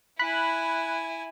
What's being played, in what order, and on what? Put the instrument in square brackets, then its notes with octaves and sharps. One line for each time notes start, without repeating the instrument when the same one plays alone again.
[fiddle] E4 G#5 [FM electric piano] B5 F#6